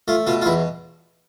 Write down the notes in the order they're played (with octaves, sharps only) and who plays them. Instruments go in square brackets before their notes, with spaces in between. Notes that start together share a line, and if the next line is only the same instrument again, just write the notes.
[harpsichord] A3 F4
B2 F4
F4
E2 E4